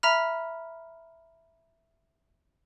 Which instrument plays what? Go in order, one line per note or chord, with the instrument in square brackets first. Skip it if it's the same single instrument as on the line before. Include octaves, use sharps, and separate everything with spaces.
[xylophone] E5 A#5 B5 F6